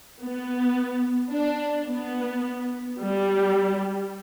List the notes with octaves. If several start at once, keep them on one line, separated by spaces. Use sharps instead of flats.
B3
D4
B3
G3